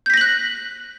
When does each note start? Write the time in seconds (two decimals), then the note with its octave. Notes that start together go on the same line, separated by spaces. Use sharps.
0.06 G6
0.10 B6
0.14 A#6
0.17 F#7
0.21 F#6